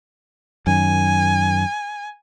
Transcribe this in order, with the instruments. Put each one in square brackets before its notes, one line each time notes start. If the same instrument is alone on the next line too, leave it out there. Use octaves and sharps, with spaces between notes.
[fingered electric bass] F#2 D#3 [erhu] G#5